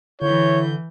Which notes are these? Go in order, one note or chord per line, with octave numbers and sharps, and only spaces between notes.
D3 E3 E4 C#5 G6